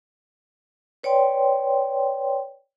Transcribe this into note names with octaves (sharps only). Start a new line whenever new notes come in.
B4 C#5 D5 G5 C6